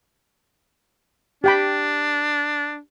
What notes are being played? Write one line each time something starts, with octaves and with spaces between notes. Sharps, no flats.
D4 G4 G5 B5